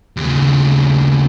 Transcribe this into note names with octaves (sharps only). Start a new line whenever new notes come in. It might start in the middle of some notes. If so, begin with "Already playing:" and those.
D#2 C#3